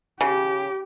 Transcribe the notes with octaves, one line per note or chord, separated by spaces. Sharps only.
C#3 G4